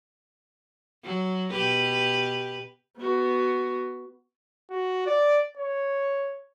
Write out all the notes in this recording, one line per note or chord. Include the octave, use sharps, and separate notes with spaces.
F#3
B2 G4 B4
B3 F#4
F#4
D5
C#5